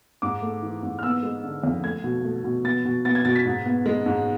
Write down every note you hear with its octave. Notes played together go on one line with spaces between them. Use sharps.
G#2 D6
A3
E3
G#2
F6
B3 E6
G#3
D3
F2
A3 G#6
B2
A3
B2
B3 A6
B2
B3 A6
G#6
B2 A6
B6
G#2
B3
G#3
G#2